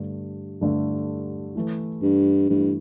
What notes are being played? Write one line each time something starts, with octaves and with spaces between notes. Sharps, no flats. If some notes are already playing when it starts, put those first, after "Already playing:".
Already playing: G2 D3 A3
G2 D3 A3
E3 A3 E4
G2
G2 E3 A3 E4